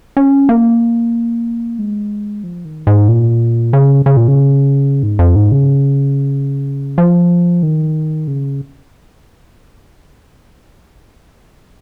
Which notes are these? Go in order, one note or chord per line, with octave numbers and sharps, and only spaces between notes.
C#4
A#3
G#3
F3
D#3
G#2
A#2
C#3
C#3
A#2
C#3
G#2
F2
G#2
C#3
F3
D#3
C#3